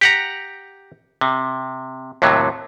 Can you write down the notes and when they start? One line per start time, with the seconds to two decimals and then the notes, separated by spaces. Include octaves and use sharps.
0.01 G4 F#5 A#5
1.21 C3
2.22 D#2 A2 C3 F#3